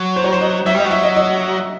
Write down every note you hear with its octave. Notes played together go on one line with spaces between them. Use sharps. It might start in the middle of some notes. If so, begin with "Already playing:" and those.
Already playing: F#3
C5
C#5
C5
D#5
F#3 E5
G3 D#5
F#3
E5
D#5
D#5